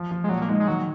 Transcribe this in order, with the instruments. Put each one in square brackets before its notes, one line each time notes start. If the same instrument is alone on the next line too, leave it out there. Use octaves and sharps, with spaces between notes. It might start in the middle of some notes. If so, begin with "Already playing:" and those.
Already playing: [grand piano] F3
F3
[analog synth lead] G#3
[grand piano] A#2 [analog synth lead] F#3
[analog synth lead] A#3
[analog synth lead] G#3 [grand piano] D#4
[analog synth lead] G#3
[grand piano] D#3 [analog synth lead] F#3